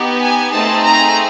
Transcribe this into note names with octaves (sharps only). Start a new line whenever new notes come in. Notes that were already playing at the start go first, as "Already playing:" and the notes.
Already playing: B3 D#4 G4
G#5
A3 C4 D#4 G#4 A5
A#5